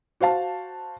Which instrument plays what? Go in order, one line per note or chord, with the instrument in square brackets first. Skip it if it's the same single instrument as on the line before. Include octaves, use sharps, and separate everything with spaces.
[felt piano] F#4 C5 F5 A5